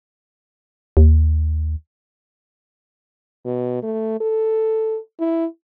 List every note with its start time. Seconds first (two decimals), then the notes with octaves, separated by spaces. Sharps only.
0.97 D#2
3.45 B2
3.83 A3
4.20 A4
5.20 E4